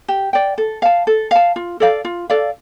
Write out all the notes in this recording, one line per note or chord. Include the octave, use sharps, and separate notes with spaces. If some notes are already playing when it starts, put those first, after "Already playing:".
G4
D5 G5
A4
F5 A5
A4
F5 A5
F4
A4 D5 F5
F4
A4 D5 F5